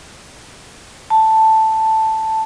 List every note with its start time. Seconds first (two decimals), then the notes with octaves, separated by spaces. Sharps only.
1.10 A5